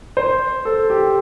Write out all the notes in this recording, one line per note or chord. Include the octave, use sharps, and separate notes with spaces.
C5
A4
G4